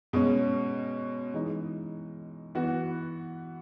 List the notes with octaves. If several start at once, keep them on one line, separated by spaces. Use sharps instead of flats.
B2 G#3 C#4
E3 G#3 D#4
E3 B3 F#4